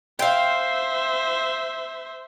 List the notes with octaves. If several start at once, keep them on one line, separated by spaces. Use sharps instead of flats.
C5 E5 F5 G5